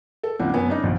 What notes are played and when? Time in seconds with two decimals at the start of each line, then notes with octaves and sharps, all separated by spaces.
0.23 A4
0.39 C#2 C3 E3 A#3 D4 F#5
0.54 F#2 B3 C#5 G#5
0.68 C#3 D4 D#4
0.83 A#1 D#2 B2